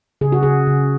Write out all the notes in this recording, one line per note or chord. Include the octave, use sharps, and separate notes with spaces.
C#3 G#4
F#4
C#3 G#4
C#3